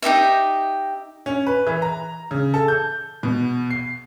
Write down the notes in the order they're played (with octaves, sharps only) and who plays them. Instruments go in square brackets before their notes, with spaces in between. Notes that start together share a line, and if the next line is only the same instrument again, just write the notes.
[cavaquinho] D#4 G4 D#5 E5
[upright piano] C#4
B4
E3
A#5
C#3
A4
G6
B2
C7